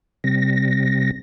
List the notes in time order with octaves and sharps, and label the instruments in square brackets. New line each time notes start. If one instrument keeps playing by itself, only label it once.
[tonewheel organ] C3 G3 C4 A#6